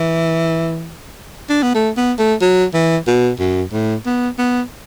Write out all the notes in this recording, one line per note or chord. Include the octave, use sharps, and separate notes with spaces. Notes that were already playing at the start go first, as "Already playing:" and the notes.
Already playing: E3
D4
B3
A3
B3
A3
F#3
E3
B2
F#2
A2
B3
B3